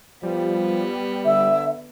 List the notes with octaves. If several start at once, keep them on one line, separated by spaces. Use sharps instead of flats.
F3 G3 B3
D3 E5